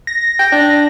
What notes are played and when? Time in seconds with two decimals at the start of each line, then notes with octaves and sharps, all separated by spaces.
0.07 A#6
0.40 G5
0.52 D4